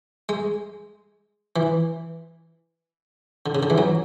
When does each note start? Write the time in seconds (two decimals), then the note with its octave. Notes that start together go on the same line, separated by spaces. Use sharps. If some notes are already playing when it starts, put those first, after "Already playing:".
0.29 G#3
1.56 E3
3.46 D3
3.55 C#3
3.63 D3
3.70 E3
3.78 F#3